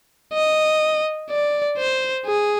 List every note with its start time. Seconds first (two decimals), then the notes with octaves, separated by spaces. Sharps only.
0.33 D#5
1.30 D5
1.78 C5
2.26 G#4